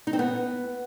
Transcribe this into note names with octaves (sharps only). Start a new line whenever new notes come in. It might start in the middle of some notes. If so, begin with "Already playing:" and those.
D#4
C4
B3